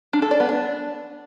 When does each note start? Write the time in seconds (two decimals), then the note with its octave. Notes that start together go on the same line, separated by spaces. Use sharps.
0.13 D4
0.22 A4
0.31 D5
0.40 B3
0.49 D4